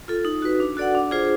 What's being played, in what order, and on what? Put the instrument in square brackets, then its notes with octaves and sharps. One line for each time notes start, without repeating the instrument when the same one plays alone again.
[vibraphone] F4 A4
D#4
F#4 B4
D4
F#4 A4 D5 F#5
D4
F4 G#4 C5